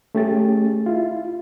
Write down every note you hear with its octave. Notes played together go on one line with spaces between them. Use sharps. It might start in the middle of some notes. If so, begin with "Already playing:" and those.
A3 C#4 G4 G#4 A6
E4 F4